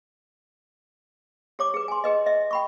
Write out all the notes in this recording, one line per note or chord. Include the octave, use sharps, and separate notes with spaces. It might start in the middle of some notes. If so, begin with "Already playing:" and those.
G4 C#5 D6
G#4 B4
G#5 C6
G#4 B4 D#5
D#5 E5
G5 B5 C#6